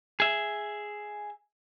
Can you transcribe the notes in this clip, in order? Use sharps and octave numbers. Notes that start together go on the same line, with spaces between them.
G#4 E5